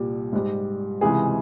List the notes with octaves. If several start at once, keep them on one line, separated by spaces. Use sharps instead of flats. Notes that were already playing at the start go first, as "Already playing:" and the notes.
Already playing: C2 A#2 G3
G#2 G3
C#2 C3 E3 G#3 G#4